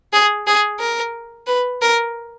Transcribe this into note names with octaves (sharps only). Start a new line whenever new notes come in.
G#4
G#4
A#4
B4
A#4